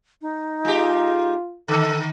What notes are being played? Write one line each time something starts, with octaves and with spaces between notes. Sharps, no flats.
D#4
G#3 F4 G4
D3 D#3 A4